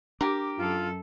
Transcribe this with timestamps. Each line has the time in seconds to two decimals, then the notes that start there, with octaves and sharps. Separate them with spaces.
0.21 D4 G4 A#4 D6
0.57 F#2 F4 A4